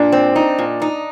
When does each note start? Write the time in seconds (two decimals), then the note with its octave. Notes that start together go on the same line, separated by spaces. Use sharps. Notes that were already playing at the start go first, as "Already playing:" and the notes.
Already playing: A#2 D4
0.12 C4
0.36 D#4
0.59 A#2
0.82 D#4